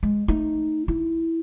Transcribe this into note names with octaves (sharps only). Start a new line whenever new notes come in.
G#3
A3 D#4
E4